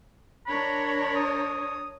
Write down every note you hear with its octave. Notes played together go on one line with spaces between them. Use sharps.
D4 A#4 C#5 B5
D#6